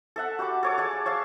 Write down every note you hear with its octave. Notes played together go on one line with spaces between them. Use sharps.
A4 E5 F#5
F#4 G4 B5 D6
A4 C#5 D6
G#4 D5 A5
C#5 E5 F5 A5